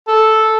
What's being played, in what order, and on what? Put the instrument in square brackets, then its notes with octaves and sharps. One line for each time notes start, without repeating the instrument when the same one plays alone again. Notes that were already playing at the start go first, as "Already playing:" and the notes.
[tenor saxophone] A4